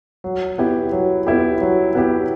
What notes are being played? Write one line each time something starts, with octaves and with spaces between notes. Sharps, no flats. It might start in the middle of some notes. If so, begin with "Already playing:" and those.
F#3
B3 E4 G4
F#3
B3 E4 G4
F#3
B3 E4 G4